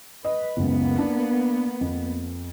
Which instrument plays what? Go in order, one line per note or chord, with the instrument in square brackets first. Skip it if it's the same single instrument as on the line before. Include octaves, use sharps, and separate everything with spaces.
[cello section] B4 [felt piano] D#5
[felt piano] F#1 C#2 [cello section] A#3 B3
[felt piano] D4
F2